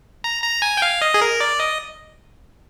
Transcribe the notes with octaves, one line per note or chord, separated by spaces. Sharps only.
A#5
A#5
G#5
G5
F5
D#5
G#4
A#4
D5
D#5